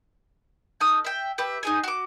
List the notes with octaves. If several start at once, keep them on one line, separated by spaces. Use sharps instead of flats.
D#4 A4 D#6 F6
E5 G5
G4 B4 E5
D#4 G#4 G#5
F#4 D6